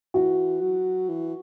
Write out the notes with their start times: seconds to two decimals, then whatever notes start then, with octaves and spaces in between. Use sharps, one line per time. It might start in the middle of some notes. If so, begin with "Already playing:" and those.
0.14 E3 F#4
0.61 F#3
1.09 E3